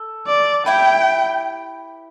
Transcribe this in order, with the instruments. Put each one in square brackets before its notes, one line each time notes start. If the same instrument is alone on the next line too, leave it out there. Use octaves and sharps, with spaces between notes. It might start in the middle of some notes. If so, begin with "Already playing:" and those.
Already playing: [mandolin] A4
[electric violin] D5
[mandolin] E4 G4 B4 [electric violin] G5